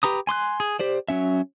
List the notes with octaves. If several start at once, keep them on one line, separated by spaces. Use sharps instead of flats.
G4 B4 A#5 D#6
G#5 C6 D6 F#6
G#4
G4 C5 D5
F#3 C#4 E5